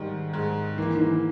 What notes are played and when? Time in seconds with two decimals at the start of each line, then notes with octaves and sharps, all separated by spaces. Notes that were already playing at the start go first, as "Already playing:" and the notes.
Already playing: G#2 D#3 G3
0.33 G#2
0.78 E3 A#3
0.95 D#3
1.01 E3